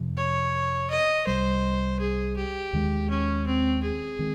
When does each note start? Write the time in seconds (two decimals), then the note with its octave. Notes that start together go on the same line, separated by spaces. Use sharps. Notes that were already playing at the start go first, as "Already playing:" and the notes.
Already playing: F2 C3 F3
0.17 C#5
0.90 D#5
1.27 C2 C3 G3 C5
2.00 G#4
2.36 G4
2.73 D#2 D#3 G#3
3.10 C#4
3.46 C4
3.82 G#4
4.19 D#3 G#3 C4